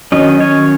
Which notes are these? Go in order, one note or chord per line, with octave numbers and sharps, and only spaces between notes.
D#3 F#3 C#4 D#5
C#5